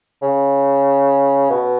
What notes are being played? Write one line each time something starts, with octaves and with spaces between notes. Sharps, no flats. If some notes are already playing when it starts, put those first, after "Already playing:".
C#3
B2